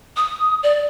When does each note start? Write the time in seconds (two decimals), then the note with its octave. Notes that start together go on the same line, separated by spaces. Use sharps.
0.17 D#6
0.63 D5